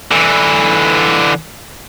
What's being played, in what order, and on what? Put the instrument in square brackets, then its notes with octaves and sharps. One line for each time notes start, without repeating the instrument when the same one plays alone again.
[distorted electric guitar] D3 E3